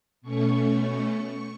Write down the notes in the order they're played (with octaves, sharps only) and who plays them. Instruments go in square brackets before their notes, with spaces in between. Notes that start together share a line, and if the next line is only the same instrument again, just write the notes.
[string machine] B2 A3 C#4 C#6